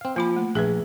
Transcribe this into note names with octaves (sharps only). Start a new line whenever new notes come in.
C4 F5
F3 A#3 F4 B5
A3
A#1 G#4 B4 E5